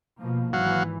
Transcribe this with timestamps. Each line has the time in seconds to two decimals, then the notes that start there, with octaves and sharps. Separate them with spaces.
0.20 B2 F3 A#3
0.53 G#1 E3 F#3 F5 F#5